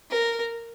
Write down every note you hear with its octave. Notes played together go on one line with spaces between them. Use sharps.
A#4